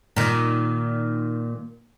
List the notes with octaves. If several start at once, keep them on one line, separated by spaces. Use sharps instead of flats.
A#2 D#3